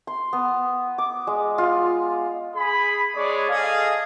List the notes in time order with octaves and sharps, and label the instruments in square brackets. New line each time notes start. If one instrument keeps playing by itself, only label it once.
[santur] C6
B3
D6
G#3
F4
[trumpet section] G#4 B5
G#3 D4 G#4 C#5 D5
G#4 A4 D#5 F5